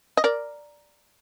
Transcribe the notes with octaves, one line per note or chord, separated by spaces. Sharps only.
D#5
A#4 D5